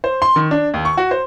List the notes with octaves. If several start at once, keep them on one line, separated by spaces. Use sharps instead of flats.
C5
C6
D#3
D4
D#2
C#6
F#4
C5